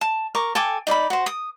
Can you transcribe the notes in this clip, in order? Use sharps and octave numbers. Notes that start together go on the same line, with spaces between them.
A5
A#4 C#6 D6
A4 G5 G#5 D6
D#4 D5 E5 B5
F#4 C5
D#6